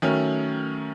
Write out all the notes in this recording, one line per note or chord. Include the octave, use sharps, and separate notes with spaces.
D#3 F#3 A3 C#4